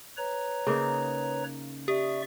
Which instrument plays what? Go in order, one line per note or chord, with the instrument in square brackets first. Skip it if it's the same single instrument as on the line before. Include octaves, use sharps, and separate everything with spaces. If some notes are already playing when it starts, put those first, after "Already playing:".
[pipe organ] B4 C#5 A#5
[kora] C#3 A#3 D#4
[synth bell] G4 [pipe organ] D5 E5 C#6